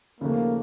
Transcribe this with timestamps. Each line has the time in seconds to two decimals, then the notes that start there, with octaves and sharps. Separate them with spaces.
0.20 D#2 C#3 F3 A3 A#3